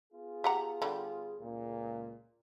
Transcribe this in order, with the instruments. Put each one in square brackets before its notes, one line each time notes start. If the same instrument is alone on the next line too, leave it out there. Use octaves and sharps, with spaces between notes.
[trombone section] B3 F4 G#4
[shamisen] G4 F#5 A#5
D3 G3
[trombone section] C#2 A#2